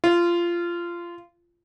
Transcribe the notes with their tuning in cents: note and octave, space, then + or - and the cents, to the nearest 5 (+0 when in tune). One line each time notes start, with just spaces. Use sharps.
F4 -20